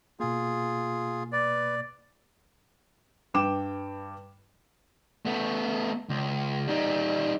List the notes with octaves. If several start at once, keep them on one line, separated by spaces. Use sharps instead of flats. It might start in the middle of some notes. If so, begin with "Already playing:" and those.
B2 A#3 F4 G#4
B4 D5
G2 B4 G5 D6 E7
A3 B3
C#2
G3 D#4